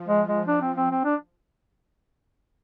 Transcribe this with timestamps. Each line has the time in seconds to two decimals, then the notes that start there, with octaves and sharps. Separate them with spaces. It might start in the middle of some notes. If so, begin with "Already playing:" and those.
Already playing: F3
0.08 G#3
0.28 G#3
0.47 D4
0.61 C4
0.77 C4
0.91 C4
1.05 D4